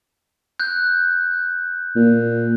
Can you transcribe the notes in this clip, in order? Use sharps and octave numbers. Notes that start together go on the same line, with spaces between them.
F#6 G6
A#2